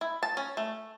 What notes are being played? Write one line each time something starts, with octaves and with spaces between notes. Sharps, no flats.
E4
A5
C#4
A3